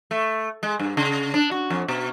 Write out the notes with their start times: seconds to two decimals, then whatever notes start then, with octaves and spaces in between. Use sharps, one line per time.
0.11 A3
0.63 G#3
0.79 G2
0.97 C#3
1.34 D4
1.51 F#4
1.70 F2
1.88 B2